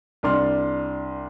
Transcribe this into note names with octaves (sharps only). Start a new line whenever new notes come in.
C2 D4 D5 C6 F6